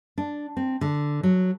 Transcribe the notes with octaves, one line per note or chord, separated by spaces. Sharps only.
D4
C4
D3
F#3